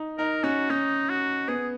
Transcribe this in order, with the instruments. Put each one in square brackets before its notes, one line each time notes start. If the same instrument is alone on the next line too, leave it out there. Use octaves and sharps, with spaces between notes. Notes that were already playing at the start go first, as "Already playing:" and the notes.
Already playing: [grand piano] D#4
[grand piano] D#4 [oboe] A#4
[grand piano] C#4 [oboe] F#4
[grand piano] C#4 [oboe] D#4
[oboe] F#4
[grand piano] B3 [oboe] G#4